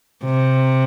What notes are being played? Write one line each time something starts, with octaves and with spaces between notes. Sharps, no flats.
C3